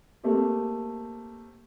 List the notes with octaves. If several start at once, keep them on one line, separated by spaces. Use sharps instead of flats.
A3 A#3 C4 G4